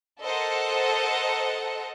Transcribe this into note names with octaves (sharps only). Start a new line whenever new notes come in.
A4 A#4 C5 D#5 F#5